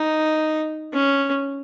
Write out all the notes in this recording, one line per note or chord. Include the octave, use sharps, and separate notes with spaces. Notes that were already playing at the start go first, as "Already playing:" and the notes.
Already playing: D#4
C#4